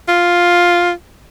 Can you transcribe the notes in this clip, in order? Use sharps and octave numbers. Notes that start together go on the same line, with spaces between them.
F4